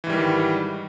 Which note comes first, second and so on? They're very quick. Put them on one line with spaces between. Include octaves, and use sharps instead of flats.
E3 G#2 G3 D#3